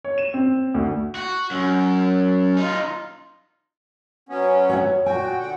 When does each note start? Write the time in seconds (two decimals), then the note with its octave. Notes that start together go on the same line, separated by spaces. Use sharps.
0.04 C#5
0.18 E7
0.34 C4
0.74 D2
1.15 F#4
1.51 F#2
2.57 D#4 F4
4.29 F#3 B3 C#4
4.69 C#5 E5 F#5
5.06 A#2 F#4 G5 G#5
5.40 D3 F#5 G5